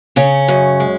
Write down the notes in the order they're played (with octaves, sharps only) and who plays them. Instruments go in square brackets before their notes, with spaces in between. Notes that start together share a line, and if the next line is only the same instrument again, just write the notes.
[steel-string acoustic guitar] C#3 C#4
F#2
G#3